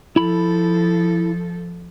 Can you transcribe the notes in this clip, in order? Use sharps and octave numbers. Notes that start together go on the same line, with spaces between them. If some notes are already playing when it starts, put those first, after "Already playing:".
F3 E4 A4 B5